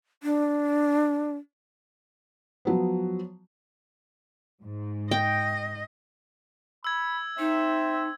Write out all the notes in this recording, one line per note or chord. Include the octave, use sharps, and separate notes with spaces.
D4
F3 F#3 B3
G#2
D#5 G5
B5 E6 G#6
C4 D#4 E5